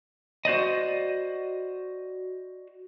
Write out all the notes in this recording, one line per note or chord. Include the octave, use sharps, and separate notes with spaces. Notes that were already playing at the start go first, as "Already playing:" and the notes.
F#4 C5 D5 D#5